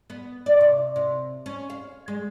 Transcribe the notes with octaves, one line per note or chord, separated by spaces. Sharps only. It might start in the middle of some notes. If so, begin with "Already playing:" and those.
B3
D5
C3
C3
C#4
F5
G#3